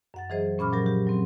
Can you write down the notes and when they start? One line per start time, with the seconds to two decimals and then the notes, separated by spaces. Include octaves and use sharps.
0.14 F#2 F#5 A6
0.30 E3 F#3 G#4 C5 D#5
0.58 A#2 C#4 B5 D6 F6
0.73 F3 F#3 G4 A#4
0.86 G4
1.07 F#3 C4